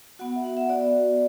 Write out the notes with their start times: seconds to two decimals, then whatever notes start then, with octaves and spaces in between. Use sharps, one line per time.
0.19 B3 F#4 F#5
0.36 E5
0.44 F#5
0.57 E5
0.69 B3 F#4 D5